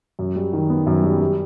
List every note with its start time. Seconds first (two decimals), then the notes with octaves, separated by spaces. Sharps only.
0.19 F#2
0.36 G3
0.53 D#3
0.70 B3
0.87 F#2
1.04 G3
1.21 G3